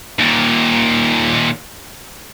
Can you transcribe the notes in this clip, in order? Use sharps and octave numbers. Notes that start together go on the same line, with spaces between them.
D#2 A#2